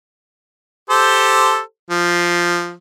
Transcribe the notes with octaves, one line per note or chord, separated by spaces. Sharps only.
G4 A4 C5
F3